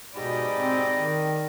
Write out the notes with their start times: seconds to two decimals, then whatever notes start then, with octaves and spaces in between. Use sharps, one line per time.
0.16 G#2 B2 G4 D5 D#5 B5
0.57 C4
0.97 D#3